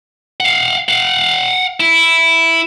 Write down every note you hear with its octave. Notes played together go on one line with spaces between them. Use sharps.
F5 F#5
F5 F#5
E4